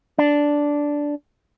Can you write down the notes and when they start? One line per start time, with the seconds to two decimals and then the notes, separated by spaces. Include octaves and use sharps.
0.18 D4